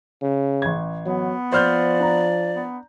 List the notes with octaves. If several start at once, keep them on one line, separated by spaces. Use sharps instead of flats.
C#3
A1 G#6
F#3 B3
F3 C5 D5 F6 G6
D4 A#5
B3